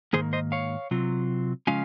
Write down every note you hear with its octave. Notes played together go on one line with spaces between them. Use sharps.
G#2 D#3 A#3 G#4 C5
C5 D#5
C#5 F5
C3 F#3 C4 F4
C#3 F3 G#3 C#4 F4 F5 G#5